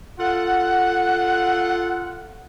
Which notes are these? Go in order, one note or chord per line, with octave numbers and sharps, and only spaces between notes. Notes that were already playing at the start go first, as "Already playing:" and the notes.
F4 A4 F#5